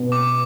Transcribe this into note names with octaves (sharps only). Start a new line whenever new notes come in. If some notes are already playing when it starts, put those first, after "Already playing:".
Already playing: B2
D6